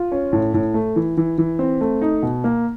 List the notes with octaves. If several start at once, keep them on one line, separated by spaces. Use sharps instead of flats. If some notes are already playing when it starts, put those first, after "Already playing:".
Already playing: F4
C#4
A2
A2
A3
E3
E3
E3
C4
A3
D#4
B2
A#3